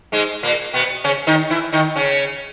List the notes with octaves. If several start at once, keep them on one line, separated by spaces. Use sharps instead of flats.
G#2 G#3
A#2 A#3
B2 B3
C#3 C#4
D#3 D#4
E3 E4
D#3 D#4
C#3 C#4